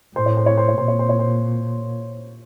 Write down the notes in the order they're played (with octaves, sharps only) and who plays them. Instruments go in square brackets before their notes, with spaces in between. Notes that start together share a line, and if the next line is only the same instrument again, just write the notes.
[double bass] A2 [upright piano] C5
[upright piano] C#5
C5
C#5
C5
C#5
[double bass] A#2 [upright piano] C5
[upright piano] C#5
C5
C#5
C5